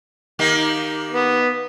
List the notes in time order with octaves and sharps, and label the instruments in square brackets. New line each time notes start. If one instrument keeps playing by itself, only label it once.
[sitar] D#3 A#3 G4
[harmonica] B3